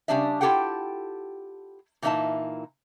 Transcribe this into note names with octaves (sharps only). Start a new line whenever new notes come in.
C#3 G3 A#3 D4 D5 E5
E4 F4 G4 A4 F#5 G5
A#2 E3 A#3 D#4 E5 A5